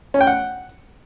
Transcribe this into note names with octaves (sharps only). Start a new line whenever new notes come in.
C#4
G5
F#5